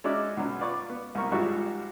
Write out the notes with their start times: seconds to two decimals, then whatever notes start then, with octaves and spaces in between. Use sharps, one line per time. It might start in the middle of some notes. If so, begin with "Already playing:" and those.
0.04 G#3 C#4 D#4 F#4 D5 E5
0.37 B1 F#3 C#4
0.59 F4 B4 D5 C#6 D6
0.90 B3
1.15 C2 C3 A#4 C#6
1.32 G#2 F3 G3 F#4 E5 C#6